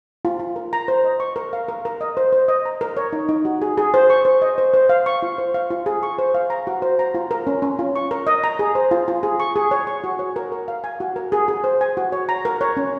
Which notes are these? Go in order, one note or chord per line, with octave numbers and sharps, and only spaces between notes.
F4
F4
A#4
A#5
C5
D#5
C#6
A#4
F5
A#4
A#4
D#5
C5
C5
D#5
A#5
A#4
C#5
D#4
D#4
F#4
G#4
G#4
C5
C#6
C5
D#5
C5
C5
F5
C#6
F4
C5
F5
F4
G#4
C#6
C5
F5
A#5
F#4
C5
A#5
F4
A#4
C#4
C#4
F4
C#6
A#4
D#5
A#5
G#4
C5
F4
F4
G#4
C#6
G#4
C#5
C#6
F#4
C#5
A#4
A#4
F5
G#5
F#4
A#4
G#4
G#4
C5
G#5
F#4
C#5
A#5
A#4
C#5
C#4